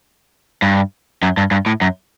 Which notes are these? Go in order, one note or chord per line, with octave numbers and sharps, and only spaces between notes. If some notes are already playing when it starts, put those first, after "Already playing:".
G2
F#2
G2
G2
A2
F#2